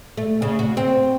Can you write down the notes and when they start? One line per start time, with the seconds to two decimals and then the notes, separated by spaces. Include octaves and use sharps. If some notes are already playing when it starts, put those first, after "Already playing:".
0.17 A3
0.42 C#3
0.59 F#4
0.77 C4